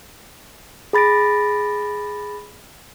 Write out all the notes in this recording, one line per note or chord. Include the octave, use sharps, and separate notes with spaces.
G#4 B5 A6 A#6 D7